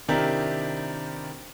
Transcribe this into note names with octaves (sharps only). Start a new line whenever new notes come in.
C3 D#3 D4 E4 G4 A#4